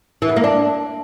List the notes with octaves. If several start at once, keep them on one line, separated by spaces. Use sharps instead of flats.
E3
B3
A#3
D4